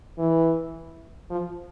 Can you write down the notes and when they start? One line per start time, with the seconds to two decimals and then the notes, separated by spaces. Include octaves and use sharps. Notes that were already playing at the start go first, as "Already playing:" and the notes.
0.18 E3
1.30 F3